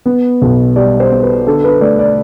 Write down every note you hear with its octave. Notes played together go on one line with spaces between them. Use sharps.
B3
B1
G3 D5
C5
B3
B4
D3 A4
B4
A3 D5
D5